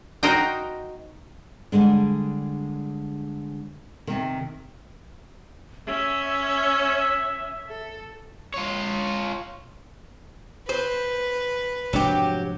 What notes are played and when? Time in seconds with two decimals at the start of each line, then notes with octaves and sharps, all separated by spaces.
0.23 D#4 F#4 A#4 C5 D#5 G5
1.72 D3 G3 G#3 D4
4.07 C3 D#3
5.87 C#4 E5
7.69 A4
8.54 F4 C#5
10.69 B4 C5
11.93 F1 G#2 F#3 D4 G4